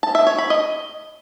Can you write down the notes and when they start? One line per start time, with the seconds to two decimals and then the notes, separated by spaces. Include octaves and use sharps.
0.03 A5
0.15 E5
0.27 C#5
0.38 B5
0.50 D#5